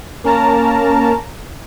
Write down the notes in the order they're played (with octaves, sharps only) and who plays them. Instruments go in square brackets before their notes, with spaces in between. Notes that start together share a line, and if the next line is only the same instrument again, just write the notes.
[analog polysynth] A#3 C#4 A#4 A5 A#5